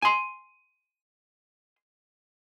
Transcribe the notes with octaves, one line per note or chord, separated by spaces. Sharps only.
G#5 C6